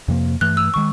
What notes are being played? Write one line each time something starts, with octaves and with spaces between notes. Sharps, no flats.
F2 C3 F3 A#3
G2 E3 A3 F#6
E6
D#3 G#3 C#6